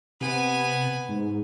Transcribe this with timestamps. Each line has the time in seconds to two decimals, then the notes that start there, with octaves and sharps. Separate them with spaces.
0.21 C3 B3 G#5
1.09 G#2